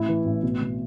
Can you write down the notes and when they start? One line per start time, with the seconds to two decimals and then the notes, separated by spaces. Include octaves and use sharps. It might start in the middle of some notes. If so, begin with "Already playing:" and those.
Already playing: A1 E4
0.08 E3
0.25 A1
0.43 B2
0.61 B2